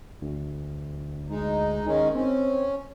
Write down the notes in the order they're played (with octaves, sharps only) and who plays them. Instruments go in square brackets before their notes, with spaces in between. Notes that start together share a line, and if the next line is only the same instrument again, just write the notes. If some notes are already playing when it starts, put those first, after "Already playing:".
[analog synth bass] D2
[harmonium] G#3 D#4
[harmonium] D#3 G#3 C#4 [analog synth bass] D#4
[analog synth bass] C4 [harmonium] C#4